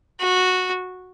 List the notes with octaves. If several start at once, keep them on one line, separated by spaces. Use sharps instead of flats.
F#4